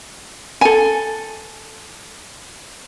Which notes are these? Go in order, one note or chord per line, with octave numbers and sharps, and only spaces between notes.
A4 G#5